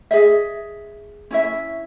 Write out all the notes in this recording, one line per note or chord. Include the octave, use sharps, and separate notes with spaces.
G#4 D#5 E5
C#4 E4 E5